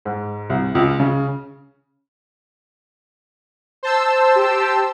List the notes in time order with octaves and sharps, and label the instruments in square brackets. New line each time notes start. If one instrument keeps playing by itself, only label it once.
[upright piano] G#2
C2
C#2
C#3
[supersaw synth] C5 A5 E6
[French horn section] G4